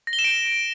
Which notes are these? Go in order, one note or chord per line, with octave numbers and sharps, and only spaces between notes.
A#6
G7
E7
D7